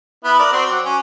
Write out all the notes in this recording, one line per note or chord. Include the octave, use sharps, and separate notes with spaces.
B3 E4 B4
A#4 D5
C4 F#4 C6
F#3 F#5 D6
C#4